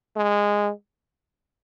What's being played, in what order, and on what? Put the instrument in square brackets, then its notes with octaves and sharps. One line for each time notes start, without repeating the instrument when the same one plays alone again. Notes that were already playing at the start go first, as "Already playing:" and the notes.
[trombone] G#3